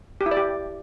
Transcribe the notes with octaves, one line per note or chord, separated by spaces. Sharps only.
G4
E4
D5
G4